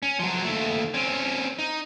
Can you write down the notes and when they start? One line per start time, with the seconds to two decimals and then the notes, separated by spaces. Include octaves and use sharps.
0.03 C#4
0.19 F3 F#3
0.44 D#2 A3
0.94 C4 C#4
1.59 D#4